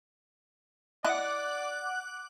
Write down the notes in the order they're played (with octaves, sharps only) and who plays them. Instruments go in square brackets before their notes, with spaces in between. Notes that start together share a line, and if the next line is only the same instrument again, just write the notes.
[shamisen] E4 D#5 [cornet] D5 [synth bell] F#5 D6 F#6